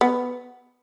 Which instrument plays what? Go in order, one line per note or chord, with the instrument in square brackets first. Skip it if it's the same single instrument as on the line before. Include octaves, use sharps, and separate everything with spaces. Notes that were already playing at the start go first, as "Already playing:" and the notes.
[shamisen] B3